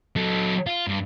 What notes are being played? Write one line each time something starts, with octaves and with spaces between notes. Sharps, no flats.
F#3 A4
F4
G2